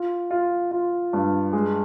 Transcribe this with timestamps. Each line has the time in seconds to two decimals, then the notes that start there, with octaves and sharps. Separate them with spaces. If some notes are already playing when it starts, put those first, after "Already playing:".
Already playing: F4
0.31 F4
0.71 F4
1.13 G2
1.53 G#3